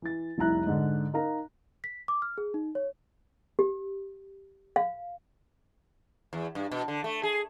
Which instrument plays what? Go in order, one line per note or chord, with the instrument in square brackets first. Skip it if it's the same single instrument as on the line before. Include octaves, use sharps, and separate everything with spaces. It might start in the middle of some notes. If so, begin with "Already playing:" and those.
[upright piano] E3 A6
F1 C2 E4 A#5 F#6
G#2 D3
D#4 A#4 F5 A#5
[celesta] B6
D6
F6
G#4
D#4
C#5
[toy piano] G4
F5
[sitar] E2
G2
B2
D3
A3
G#4